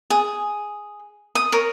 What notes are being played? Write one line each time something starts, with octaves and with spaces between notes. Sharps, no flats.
G#4
D#6
A#4 C#5